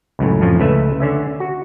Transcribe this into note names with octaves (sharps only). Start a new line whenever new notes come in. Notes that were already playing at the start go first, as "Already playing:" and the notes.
C#2 F#2 A2
F2 A2 F3
C#2 A3 B4 E5
D3 C#4 E5
F#4